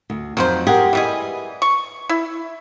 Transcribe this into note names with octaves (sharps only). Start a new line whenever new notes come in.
D2
F2 D#3 F3 F#3 C5
G4 G#4 A#4 F#5
E3 G3 G#4 B4 D#5
C#6
E4